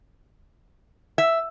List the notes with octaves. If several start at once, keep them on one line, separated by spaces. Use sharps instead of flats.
E5